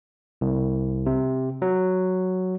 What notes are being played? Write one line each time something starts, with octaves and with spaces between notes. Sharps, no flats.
C2
C3
F#3